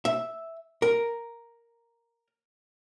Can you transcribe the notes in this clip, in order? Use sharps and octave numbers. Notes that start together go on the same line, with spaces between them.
E5
A#4